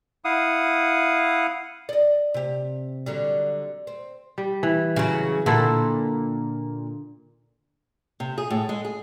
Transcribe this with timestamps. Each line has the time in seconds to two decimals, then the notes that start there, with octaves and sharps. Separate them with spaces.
0.25 E4 F5 F#5 D#6
1.89 D5 D#5
2.34 C3 G4
3.06 D3 F#3 G3
3.87 C4
4.38 G3
4.63 E3
4.96 C#3 F#3
5.46 A#2 D3 E4 A4
8.20 C3
8.38 G#4
8.50 A2
8.69 G#3
8.85 G#4